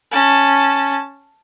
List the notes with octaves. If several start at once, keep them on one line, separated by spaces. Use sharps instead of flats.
C#4 A5